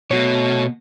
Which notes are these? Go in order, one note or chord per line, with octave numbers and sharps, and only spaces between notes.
B2 A3 F#4 C#5